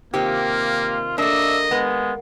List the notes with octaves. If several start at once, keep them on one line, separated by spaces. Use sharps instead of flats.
C3 D#3 A#3 F4 G4
A#3 D4 A4 D#5 E5
G#3 B3